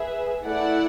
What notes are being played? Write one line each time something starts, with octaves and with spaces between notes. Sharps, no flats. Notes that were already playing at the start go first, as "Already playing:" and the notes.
Already playing: G#4 B4 E5
A3 E4 A4 D5 F#5